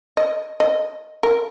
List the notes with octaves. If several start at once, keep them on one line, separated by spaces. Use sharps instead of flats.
D#5
D#5
A#4